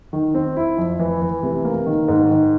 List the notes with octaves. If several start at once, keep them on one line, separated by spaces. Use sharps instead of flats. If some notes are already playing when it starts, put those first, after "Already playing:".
D#3
C4
E4
F2
E3
E3
C3
A#3
D#3
G#2
D#3